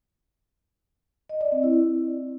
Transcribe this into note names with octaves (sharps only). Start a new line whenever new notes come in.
D#5
D5
C4
E4